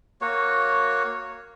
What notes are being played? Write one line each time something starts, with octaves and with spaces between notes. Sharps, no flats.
A#3 F#4 C#5